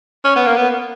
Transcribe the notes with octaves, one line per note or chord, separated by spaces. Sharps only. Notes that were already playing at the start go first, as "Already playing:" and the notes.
C#4
B3
A#3
B3